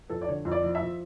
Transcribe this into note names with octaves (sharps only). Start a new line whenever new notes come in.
F2 A4
D5
D3 C#5
F2
D5
F3
E5
F3